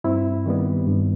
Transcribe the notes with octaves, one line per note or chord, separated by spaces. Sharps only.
G2 C4 E4
D#3 G3 B3
G2